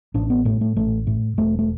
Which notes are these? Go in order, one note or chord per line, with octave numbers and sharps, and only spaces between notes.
A1 D4
B3
A2 A3
A3
A1 A3
A2 A3
E1 A3
A3